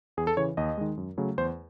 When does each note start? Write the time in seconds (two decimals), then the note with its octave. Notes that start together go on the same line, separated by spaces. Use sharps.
0.17 E2 G#4
0.27 A4
0.37 C#3 E3 C#5
0.57 D#2 D#5
0.78 D#3 G#3
0.97 F#2
1.18 C#3 F#3 A3
1.38 E2 C5